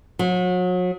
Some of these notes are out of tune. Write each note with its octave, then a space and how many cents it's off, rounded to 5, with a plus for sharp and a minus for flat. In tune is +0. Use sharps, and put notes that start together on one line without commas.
F#3 -35